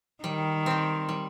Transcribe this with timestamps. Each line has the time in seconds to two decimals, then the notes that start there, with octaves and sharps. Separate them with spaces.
0.24 D#3 G3
0.66 C4 G4
1.09 G3